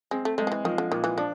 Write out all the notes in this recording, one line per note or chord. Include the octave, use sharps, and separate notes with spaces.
G#3 C4
A3
G#3 A3
F3
E3
D#3 F3
D3
A#2 D#3
E3
F3 D4